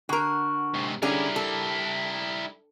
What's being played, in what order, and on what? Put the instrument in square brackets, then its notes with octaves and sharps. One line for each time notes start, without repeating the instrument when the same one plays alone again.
[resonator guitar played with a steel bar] D3 A#4 [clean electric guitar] F#4
[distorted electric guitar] G#2 C3
[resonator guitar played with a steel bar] D3 C#4 G#4 [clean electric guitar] G3 [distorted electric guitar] E4 A#4
[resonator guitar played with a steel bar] A4